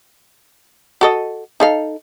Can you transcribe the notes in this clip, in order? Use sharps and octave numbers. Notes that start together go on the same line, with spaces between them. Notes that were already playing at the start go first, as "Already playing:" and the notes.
F#4 A4 D#5
D#4 A4 F5